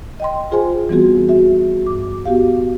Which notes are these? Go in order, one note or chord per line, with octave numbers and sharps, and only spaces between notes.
D#5 G5 C6
F4 G#4 C5 G#5 C6
E3 G3 B3 C4 F#4 G#4
F#4 E5
G2 D6
B3 F#4 G4 F5